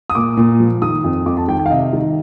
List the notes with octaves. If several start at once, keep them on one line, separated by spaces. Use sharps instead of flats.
D#6
A#2 D6
A#2
F3
D#3 D#6
F2
F2 D6
A5
D#3 G5
G5
F5
C3 D#5
D#3